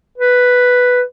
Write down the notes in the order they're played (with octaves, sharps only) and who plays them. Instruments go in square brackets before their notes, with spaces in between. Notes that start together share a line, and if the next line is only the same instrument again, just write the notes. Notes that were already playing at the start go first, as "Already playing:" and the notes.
[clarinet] B4